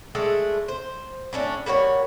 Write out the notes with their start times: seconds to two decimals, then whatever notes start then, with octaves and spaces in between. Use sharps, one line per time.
0.15 G#3 A3 D4 A4
0.68 C5
1.33 A2 C#4 D4
1.66 G3 A#3 F#4 C#5